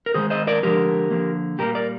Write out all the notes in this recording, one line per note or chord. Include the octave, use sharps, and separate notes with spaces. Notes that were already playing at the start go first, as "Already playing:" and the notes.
A#4
D#3 G#3 G#4 C5
C5 D#5
A#4 D5
D3 F3 G#3 G4 A#4
D3 F3 A#3
A#2 G3 A#3 G4 A#4
A#4 D5